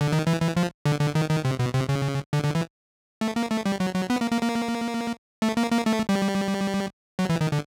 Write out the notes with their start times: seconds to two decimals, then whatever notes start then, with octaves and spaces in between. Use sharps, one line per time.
0.01 D3
0.12 D#3
0.27 E3
0.42 E3
0.57 F3
0.86 D3
1.01 D3
1.15 D#3
1.30 D#3
1.45 C3
1.59 B2
1.74 C3
1.89 C#3
2.33 D3
2.44 D3
2.55 E3
3.21 A3
3.36 A#3
3.51 A3
3.66 G3
3.80 F#3
3.95 F#3
4.10 B3
4.21 A#3
4.31 A#3
4.42 A#3
5.42 A3
5.57 A#3
5.72 A#3
5.86 A3
6.09 G3
7.19 F#3
7.29 E3
7.41 D#3
7.52 D3